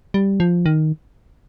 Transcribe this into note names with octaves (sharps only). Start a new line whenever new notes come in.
G3
F3
D#3